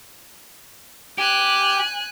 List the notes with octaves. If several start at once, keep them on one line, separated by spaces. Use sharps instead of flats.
G4 G#5 F#6